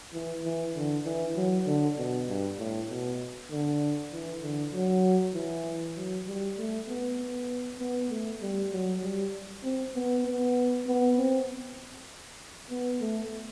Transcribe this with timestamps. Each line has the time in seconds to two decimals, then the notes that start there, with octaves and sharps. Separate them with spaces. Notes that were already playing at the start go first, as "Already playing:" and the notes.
0.13 E3
0.44 E3
0.75 D3
1.05 E3
1.36 F#3
1.66 D3
1.98 B2
2.27 G2
2.59 A2
2.90 B2
3.51 D3
4.12 E3
4.43 D3
4.74 F#3
5.34 E3
5.96 F#3
6.27 G3
6.58 A3
6.88 B3
7.19 B3
7.79 B3
8.10 A3
8.41 G3
8.72 F#3
9.03 G3
9.64 C4
9.95 B3
10.25 B3
10.87 B3
11.17 C4
12.70 B3
13.01 A3